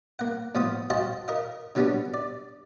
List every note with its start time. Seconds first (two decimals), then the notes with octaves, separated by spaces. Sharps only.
0.19 A#3 F#5
0.55 A2 F3 B3 C5 D#6
0.90 F#4 C5 D#5 F5 G5 A5
1.28 A#4 D#5 F5
1.75 D3 F#3 G3 B3 C#4 D4
2.14 D5